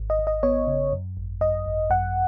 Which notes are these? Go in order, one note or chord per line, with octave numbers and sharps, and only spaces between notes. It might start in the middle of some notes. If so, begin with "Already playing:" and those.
Already playing: G#1
D#5
G#1
D#5
B3 C#5
C#3
F#2
G#1
F#2 D#5
G#1
F#2 F#5